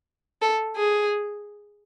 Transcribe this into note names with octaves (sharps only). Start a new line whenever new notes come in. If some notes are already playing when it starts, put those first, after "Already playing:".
A4
G#4